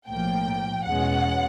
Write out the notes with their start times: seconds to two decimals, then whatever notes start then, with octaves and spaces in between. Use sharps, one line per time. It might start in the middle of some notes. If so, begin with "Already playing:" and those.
0.08 B1 A2 F3 A#3 G5
0.85 E2 B2 G#3 C#4 F#5